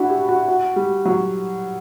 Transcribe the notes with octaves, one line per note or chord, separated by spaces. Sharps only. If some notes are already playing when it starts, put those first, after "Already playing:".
Already playing: D4 E4 F#4
G4
F#4
F#4
G3
F#3